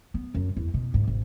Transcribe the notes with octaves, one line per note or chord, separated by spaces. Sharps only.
B3
F#2
E2
B2
G#2
G#1